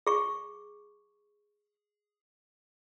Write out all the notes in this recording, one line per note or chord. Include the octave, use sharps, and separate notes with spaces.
G#4 C#6